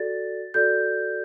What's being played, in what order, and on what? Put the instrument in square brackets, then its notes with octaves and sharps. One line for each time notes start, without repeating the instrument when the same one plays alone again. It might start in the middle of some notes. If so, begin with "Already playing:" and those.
Already playing: [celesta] F#4 A4 D5 A6
F#4 A4 D5 G6